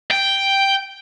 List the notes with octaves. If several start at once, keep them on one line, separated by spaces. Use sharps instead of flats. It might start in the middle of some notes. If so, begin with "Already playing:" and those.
G5